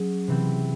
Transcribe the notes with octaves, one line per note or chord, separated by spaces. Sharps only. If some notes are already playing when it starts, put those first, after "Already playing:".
Already playing: F#3 C#4 G#4
C3 E3 C4